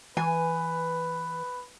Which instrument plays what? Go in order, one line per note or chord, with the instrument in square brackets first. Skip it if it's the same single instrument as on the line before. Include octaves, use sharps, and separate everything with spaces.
[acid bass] E3 [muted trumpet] B4 [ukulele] G#5